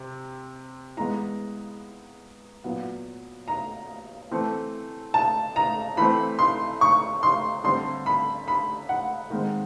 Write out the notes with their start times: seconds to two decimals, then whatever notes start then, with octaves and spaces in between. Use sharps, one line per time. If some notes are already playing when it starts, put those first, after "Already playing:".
Already playing: C3
0.97 E3 G#3 B3 A#5
2.64 A#2 F#3 B3
3.48 A#5
4.31 E3 A3 C4
5.14 A5
5.56 A#5
5.97 E3 A3 C4 B5
6.39 C6
6.81 C#6
7.23 C6
7.64 D3 G3 C4 C6
8.06 B5
8.48 B5
8.89 F#5
9.30 D#3 G#3 C4